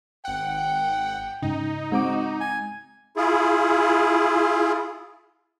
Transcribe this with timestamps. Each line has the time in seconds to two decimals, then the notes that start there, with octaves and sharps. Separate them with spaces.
0.25 G#1 F#5 G5
1.42 G#2 C#3 D#4
1.92 G#3 C4 F#4 D6
2.41 G#5
3.17 E4 F4 G#4